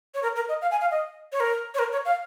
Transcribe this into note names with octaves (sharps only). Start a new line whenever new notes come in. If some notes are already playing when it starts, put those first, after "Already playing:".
C#5
A#4
A#4
D#5
F5
G#5
F5
D#5
C#5
A#4
C#5
A#4
C#5
F5